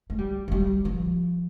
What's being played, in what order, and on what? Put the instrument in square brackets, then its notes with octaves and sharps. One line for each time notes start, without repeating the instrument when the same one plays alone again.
[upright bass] A3
G3
F3
G3
F3